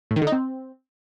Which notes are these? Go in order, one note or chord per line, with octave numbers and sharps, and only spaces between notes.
A2
D#3
D3
D#4
C4